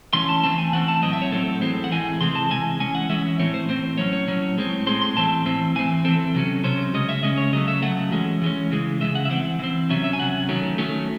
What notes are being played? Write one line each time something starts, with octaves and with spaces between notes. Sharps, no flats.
E3 A3 C#4 C6
A5
E3 A3 C4 A5
G#5
E3 A3 C4 F#5
A5
A2 F#3 C4 D#5
E5
C#5
A2 F#3 C4 A4
A2 E3 G#3 C4
F#5
A2 E3 G#3 C4 G#5
C3 E3 G#3 C4 C6
A5
C3 E3 G#3 G#5
E3 G#3 C#4 G#5
F#5
E3 G#3 C#4 E5
A2 E3 C4 C#5
C5
A2 E3 C4 C5
A2 F#3 C#4 C#5
C#5
A2 F#3 C#4
A2 G#3 C4
A2 G#3 C4 C6
C6
A2 E3 C4 A5
A2 E3 C4
E3 C4 G#5
E3 C4 A4
C3 F#3 C#4
C3 F#3 C#4 C5
C#3 G#3 C#4 D#5
E5
C#3 G#3 C#4 D#5
C#5
C#3 F#3 A3 D#5
E5
C#3 F#3 A3 F#5
E3 G#3 C#4
E3 G#3 C#4
C#3 E3 G#3
C#3 E3 G#3 E5
F#5
E5
E3 C4 F#5
E3 C4
C3 F#3 C#4 E5
E5
G#5
C3 F#3 C#4 F#5
D#3 F#3 A3 C#4
D#3 F#3 A3 C#4